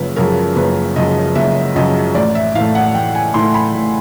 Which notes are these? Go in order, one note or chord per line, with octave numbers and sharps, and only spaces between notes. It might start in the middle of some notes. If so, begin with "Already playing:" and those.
Already playing: F#1 F#2 C#3 F3 G#3 B4
F#2 C#3 F3 G#3 A#4
F#1 B4
F#2 C#3 F3 G#3 D#5
F#1 E5
F#2 C#3 F3 G#3 D#5
A1 D5
E5
A2 E3 A3 F5
F#5
A1 G5
G#5
A2 E3 A3 C6
B5
A1